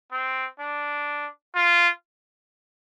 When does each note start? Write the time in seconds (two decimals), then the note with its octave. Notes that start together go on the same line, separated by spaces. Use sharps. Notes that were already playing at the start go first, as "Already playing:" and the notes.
0.12 C4
0.60 D4
1.55 F4